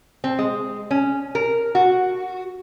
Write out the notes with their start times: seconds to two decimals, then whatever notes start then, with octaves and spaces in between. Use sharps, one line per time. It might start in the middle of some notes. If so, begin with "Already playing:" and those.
0.24 C4
0.39 G#3
0.91 C#4
1.35 A#4
1.75 F#4